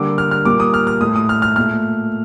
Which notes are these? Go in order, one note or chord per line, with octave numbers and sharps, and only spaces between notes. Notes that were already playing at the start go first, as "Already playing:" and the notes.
Already playing: D3 G3 A#3 D6
F6
F6
A#2 G3 A#3 D6
D#6
F6
F6
A2 A3 D#6
D#6
F6
F6
A#2 A3 F6